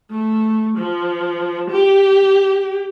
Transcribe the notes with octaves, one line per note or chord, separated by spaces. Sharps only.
A3
F3
G4